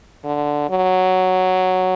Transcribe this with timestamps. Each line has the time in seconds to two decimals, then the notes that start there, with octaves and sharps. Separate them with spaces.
0.24 D3
0.70 F#3